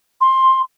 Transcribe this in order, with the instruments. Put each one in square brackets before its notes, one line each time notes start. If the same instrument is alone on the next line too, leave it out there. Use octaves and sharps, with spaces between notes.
[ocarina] C6